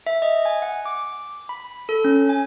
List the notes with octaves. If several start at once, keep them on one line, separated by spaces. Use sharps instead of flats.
E5
D#5
G#5
F#5
D6
B5
A4
C#4
G#5